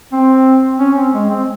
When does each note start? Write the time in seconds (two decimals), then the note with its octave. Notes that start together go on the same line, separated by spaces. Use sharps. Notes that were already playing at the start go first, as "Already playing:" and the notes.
0.12 C4
0.79 C#4
0.97 C4
1.14 G#3
1.29 C4